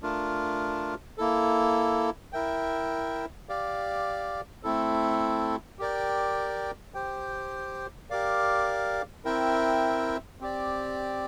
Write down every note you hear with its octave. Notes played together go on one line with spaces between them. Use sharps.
A3 D4 F4 A#4
A#3 E4 A4
E4 A#4 E5 G5
G4 D5 F5
A3 C4 E4 A4
G4 A#4 D5 G5
G4 C5 G5
G4 A#4 D5 F5
C4 E4 A#4 E5 G5
C4 G4 D5